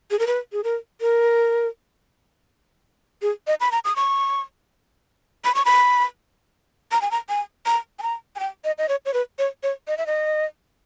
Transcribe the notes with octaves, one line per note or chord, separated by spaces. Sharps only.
G#4
A#4
B4
G#4
A#4
A#4
G#4
D#5
B5
A#5
D#6
C#6
B5
C#6
B5
A#5
G#5
A#5
G#5
A#5
G#5
A#5
G#5
G5
D#5
D#5
C#5
C#5
B4
C#5
C#5
D#5
E5
D#5